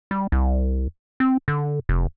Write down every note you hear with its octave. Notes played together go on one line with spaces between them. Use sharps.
G3
C2
C4
D3
F1